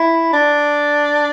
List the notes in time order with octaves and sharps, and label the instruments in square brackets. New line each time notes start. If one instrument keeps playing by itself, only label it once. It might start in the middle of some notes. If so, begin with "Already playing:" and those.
Already playing: [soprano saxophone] E4
D4